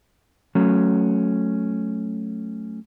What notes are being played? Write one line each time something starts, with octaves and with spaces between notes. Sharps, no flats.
F#3 A3 C#4